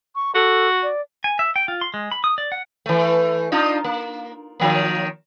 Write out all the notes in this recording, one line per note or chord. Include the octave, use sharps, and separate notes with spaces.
C#6
F#4 A4
D5
G#5
E5
G5
F4
C6
G#3
B5
D#6
D5
F#5
E3 A3
D4 D#4 F4
A#3
D#3 F3 A#3